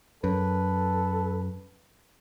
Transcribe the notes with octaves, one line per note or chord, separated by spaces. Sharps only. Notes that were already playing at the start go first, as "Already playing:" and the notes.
F#2 A4 B4